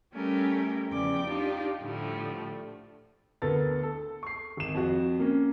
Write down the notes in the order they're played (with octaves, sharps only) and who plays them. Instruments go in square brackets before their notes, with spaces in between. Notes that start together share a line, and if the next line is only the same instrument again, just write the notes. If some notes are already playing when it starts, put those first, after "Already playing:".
[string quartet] G3 A3 C#4 G4 A#4
E2 C#3 F3 D5 G5 D6
D4 D#4 F4 G4
A2 D3 F3 G3 A3
[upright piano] D2 B3 A4 A#4 A6
A4
C#6 C7
G#1 E7
F2 F#4
A#3 C#4